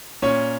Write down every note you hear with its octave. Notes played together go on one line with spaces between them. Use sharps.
A#2 C#4 C#5